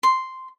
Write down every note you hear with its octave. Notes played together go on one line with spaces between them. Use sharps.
C6